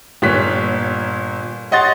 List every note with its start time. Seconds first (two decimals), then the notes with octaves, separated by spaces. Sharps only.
0.22 G1 A#2 C#5 F#6 B6
1.71 C#5 D#5 F#5 C6 A6